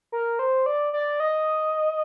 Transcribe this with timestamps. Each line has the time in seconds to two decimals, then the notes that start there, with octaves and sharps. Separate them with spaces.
0.12 A#4
0.39 C5
0.66 D5
0.93 D5
1.20 D#5